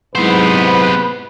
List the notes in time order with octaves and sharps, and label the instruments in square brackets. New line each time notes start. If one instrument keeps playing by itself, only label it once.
[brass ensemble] G#2 C3 [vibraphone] F#3 E4 B5 [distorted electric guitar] B3 C5 [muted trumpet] B4